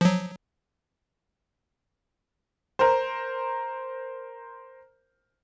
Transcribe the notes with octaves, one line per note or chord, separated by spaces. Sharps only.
F3 F#3
A#4 C5